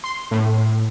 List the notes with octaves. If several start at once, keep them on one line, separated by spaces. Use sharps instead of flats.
C6
A2